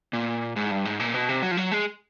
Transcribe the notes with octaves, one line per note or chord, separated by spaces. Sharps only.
A#2
G#2
G2
G#2
A#2
B2
C3
F#3
F3
F#3
G#3